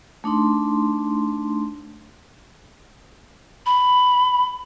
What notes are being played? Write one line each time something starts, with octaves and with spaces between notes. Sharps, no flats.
A3 D4 D#4 C6
B5